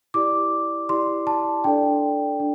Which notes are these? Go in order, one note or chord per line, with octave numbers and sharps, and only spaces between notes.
E4 G4 D5 D6
E4 G4 D5 C6
A5
D4 A4 D5 G5
D4